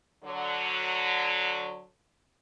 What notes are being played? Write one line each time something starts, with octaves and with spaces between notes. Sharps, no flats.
D3 F#3